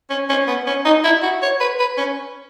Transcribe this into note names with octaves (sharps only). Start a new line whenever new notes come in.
C#4
C#4
B3
C#4
D#4
E4
F#4
C#5
B4
B4
C#4